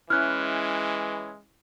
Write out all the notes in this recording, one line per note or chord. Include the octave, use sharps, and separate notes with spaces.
E3 G#3 C#4 E4 F6 F#6